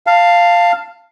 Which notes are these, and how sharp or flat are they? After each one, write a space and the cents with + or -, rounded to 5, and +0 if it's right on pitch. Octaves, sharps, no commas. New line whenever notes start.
F5 +0 A5 +20